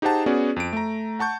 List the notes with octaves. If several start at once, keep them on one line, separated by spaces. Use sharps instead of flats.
D#4 G4 G#4 C5 F#5 A5
B3 C#4 F#4 G#4 D5
F2 D7
A3 A#5
F#5 A5 C#6 G6